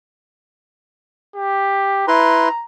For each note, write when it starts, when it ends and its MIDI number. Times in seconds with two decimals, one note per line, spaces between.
1.35 2.06 67
2.08 2.49 64
2.08 2.49 71
2.08 2.65 82
2.08 2.49 84